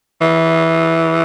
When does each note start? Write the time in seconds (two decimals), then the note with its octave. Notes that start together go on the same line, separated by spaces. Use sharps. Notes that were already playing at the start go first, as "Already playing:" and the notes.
0.21 E3